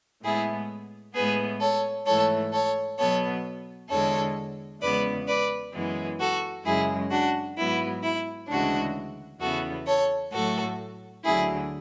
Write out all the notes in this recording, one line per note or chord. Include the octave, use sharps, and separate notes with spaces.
A2 G#3 B3 E4 G#4
A2 G#3 B3 G#4 B4
A4 C#5
G#2 E3 A3 A4 C#5
A4 C#5
B2 F#3 B3 A4 C#5
E2 D3 G#3 A4 C#5
E2 C#3 G#3 B3 B4 D5
B4 D5
F#2 E3 G#3 B3
F#4 A4
F#2 C#3 G#3 E4 G#4
D4 F#4
G#2 F#3 B3 E4
E4
D2 C#3 E3 G#3 D4 F#4
E2 C#3 E3 B3 F#4 A4
A4 C#5
A2 F#3 A3 F#4 A4
D2 D3 F#3 E4 G#4